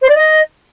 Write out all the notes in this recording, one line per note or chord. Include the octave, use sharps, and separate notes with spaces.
C5
D5
D#5